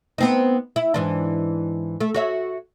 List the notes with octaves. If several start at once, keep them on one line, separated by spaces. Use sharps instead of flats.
B3 C4 D#4
E4
G#2 E3 D4
A3
F#4 C#5 E5